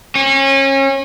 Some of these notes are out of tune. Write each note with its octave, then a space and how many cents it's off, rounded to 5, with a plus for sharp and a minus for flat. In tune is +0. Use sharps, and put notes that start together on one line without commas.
C#4 -30